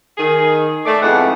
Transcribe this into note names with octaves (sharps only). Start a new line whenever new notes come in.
D#3 G#4
A3 D5
F2 G#2 G#3 B3 E4 F#5